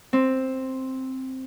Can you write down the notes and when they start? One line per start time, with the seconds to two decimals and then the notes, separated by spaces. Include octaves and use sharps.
0.13 C4